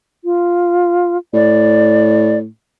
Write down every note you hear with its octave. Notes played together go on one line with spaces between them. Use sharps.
F4
A2 D5